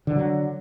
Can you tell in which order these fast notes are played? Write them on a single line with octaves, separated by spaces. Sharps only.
D3 D#3 F#3